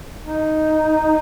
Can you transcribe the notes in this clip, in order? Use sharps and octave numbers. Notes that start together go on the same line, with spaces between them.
D#4